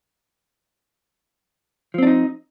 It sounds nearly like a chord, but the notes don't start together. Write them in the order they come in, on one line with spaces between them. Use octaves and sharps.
F3 C4 D4 D#4